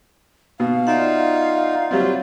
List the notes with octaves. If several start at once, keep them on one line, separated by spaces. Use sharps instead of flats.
B2 F5
D#4 F4 D5 E5 F#5
F#3 G3 C4 F4 F5